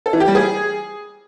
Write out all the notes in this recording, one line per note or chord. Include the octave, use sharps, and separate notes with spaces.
A4
E3
G4
G3
G#4